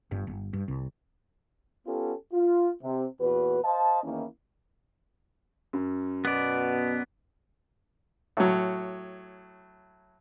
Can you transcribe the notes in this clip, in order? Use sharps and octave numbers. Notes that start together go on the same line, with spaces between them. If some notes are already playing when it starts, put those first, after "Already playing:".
G1 G2
G1
G2
C2
B3 C#4 F4 G4 A4
F4
C3
E2 A#2 F#4 B4
C5 D#5 F5 A5
E2 D#3 A#3 C#4 E4
F#2
B2 B3 D5
A2 F#3